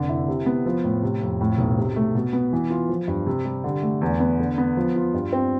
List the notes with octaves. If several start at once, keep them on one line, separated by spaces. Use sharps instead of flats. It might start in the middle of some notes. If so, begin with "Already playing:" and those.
Already playing: F1 D3
E4
C3
B3
F3
A2
C3
F2
A2
B1
C3
A3
B2
B3
E3
F4
F3
G2
C3
G3
D3
A3
E2
B3
D3
B3
F3
F4
G2
C4